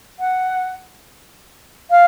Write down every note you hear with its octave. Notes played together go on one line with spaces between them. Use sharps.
F#5
F5